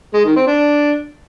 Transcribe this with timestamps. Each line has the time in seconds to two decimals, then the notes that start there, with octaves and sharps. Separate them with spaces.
0.14 G#3
0.25 D#3
0.36 C4
0.47 D4